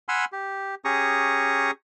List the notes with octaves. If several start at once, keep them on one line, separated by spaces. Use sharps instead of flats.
F#5 G#5 B5 C6 E6 F6
G4
C#4 G4 G#4 A#5 C#6 D#6